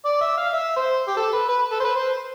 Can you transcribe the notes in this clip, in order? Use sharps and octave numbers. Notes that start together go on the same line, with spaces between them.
D5
E5
F5
E5
C5
G4
A4
B4
B4
A4
C5
B4
C5